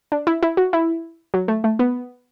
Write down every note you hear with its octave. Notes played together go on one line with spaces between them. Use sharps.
D4
E4
E4
F#4
E4
F#3
A3
A3
B3